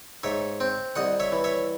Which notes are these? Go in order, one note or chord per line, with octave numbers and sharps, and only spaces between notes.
G#2 C#5 E5
C4
C2 D#5 F#5
C#5 E5
E3
C#5 E5